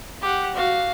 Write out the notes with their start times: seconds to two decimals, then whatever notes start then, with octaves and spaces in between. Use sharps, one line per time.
0.22 G4 F#5
0.55 F#4 F5